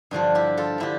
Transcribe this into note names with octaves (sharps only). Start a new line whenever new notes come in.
G2 D3 F3 D4 F4
E4 G4
F4 A4
D3 F3 E4 G4